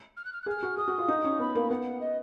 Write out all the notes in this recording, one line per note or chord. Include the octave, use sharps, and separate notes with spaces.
F6
F#6
F6
F#6
G#4 F6
F#4
G#4 D#6
F#4
F4
D#4
C#4
B3 B5
A#3
B3 F#5
D#5